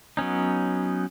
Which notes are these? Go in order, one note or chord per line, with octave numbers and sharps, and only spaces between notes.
F#3 B3 C#4 D#4